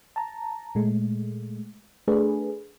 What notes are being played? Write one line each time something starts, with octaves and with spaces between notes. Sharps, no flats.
A5 A#5
A#2 G#3 A3
A3 D4 G#4 B4